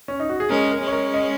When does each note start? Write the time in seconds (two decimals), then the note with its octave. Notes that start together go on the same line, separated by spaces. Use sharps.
0.08 C#4
0.20 D#4
0.29 F#4
0.40 G#4
0.49 G#3 C#4 A#4
0.71 A#4
0.81 G#3 C#4
0.87 C#5
0.92 A#4
1.14 D#5